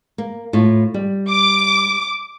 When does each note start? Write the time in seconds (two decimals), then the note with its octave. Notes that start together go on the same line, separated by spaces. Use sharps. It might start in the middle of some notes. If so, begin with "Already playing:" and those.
0.18 A#3
0.53 A2 F4
0.94 G3
1.31 D6